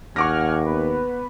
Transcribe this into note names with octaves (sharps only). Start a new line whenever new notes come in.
D#2 F#5 G#5 C#6 D6 F6 A#6
B3 B4